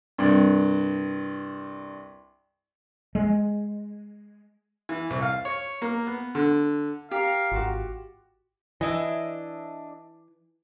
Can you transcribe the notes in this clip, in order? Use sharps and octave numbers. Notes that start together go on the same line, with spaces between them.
C2 G2
G#3
E3
C2
F5
C#5
A#3
B3
D3
G4 A#4 F5
G#1 F4 F#4
E3 D4 E4 D#5